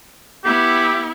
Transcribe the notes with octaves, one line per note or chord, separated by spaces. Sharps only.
B3 E4 G4